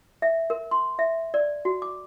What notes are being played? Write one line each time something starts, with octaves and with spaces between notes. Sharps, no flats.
E5
A#4
C6
E5
D5
F#4
D6